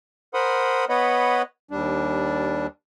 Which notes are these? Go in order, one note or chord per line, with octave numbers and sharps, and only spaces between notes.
A#4 C5 F#5 B5 C6 D#6
B3 B4 C#5 D#5 F#5 B5
D#2 G3 D4